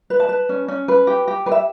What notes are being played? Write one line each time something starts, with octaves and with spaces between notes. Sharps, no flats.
B4
A5
B4
C#4
C#4
B4
G4
G4
B4
E5